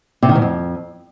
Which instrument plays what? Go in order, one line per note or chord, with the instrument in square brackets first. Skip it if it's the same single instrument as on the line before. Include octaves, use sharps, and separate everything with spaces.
[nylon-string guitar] C3
D#3
G#2
F2